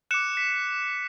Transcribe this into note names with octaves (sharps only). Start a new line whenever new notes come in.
D6 F#6 C#7 E7
B6